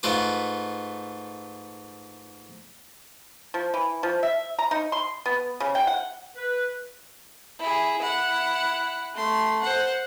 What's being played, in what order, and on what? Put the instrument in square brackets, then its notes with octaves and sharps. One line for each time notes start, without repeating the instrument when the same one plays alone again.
[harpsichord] G#2 A3 F4 B4 D6
[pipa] F3
E3
F3
E5
A#5
D#4
C6
B3
C#3
G5
F#5
[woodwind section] B4
[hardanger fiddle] E4 G#4
E4 F#5
A3 C6
C5 F#5